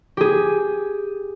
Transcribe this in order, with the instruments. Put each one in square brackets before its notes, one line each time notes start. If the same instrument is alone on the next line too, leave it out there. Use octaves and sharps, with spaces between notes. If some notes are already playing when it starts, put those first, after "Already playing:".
[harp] G4 G#4